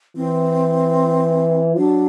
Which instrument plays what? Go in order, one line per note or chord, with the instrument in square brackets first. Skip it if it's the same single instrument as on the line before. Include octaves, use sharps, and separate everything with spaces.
[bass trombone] E3 [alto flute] C4
[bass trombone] F#3 [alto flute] D4